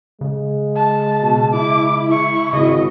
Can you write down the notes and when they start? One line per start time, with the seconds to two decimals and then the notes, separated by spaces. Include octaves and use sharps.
0.21 C#3 G#3
0.75 A5
1.23 B2
1.53 E4 D6
2.11 C#6
2.53 G#1 C#3 D#5